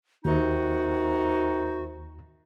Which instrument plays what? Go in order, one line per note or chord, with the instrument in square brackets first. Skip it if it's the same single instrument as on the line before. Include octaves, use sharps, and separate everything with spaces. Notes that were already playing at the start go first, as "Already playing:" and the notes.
[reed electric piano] D#2 [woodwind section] C3 D#3 D#4 [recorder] F#4